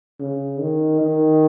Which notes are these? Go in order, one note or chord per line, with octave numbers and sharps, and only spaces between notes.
C#3
D#3
D#3